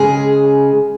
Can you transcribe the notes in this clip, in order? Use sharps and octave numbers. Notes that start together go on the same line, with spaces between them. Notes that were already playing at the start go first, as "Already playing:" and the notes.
Already playing: C#3 G#3 G#4